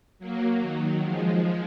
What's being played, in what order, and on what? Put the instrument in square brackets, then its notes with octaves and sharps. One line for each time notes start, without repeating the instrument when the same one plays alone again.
[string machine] F#3 A#3
D#3 F#3
F3 G#3